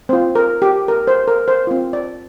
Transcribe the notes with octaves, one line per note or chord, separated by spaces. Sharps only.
C4 F4 C5
A#4
G4
A#4
C5
A#4
C5
C4 F4
D5